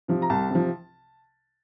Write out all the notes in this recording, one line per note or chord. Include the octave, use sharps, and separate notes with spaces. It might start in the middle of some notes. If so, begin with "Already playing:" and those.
C3 F3
A#5
C2 A5
C3 F3